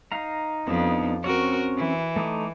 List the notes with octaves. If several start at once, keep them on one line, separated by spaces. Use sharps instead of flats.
D#4 F5 A#5
F2 B3 D4 D#4
C4 C#4 F#4 A#4 C#5
E3
A3 D#4 D6